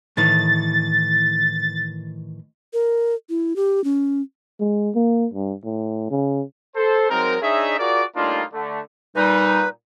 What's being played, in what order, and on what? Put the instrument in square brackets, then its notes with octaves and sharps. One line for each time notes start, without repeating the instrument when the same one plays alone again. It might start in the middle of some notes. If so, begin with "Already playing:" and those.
[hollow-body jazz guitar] A2 D#3 E3 [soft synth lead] A6
[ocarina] A#4
E4
G4
C#4
[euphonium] G#3
A#3
G2
A2
C#3
[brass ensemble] A4 C5
F#3 G#3 C4 D#4 A#4
D4 D#4 G#4 C#5 D#5 E5
F4 F#4 G#4 A#4 D5
A2 G3 A#3 D4 D#4 F4
D3 A3
[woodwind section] A#2 G3 D#4 [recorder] B4